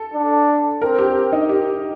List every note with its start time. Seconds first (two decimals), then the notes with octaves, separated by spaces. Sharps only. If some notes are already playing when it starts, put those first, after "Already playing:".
Already playing: A4
0.14 D4
0.81 C4 A#4
0.98 G4
1.32 D#4
1.49 G4